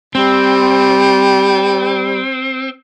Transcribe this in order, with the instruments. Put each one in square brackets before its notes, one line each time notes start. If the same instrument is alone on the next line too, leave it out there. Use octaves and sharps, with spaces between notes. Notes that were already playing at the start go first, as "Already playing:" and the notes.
[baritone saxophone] G3 [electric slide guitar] C4